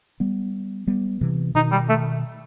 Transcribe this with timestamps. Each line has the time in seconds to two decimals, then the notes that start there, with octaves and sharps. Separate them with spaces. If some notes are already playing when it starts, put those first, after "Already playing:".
0.20 G3 B3
0.87 G3 B3
1.21 C3 E3
1.55 B2 D#3 D#4
1.72 G3
1.89 A3